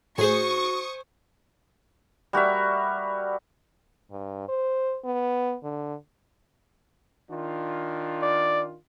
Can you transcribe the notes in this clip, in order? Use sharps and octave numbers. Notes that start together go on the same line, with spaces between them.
A2 F#4 G#4 C5 G#5 C#6 D#6
G3 F#4 A#4 E5
G2
C5
B3
D3
D#3 D4 F4
D5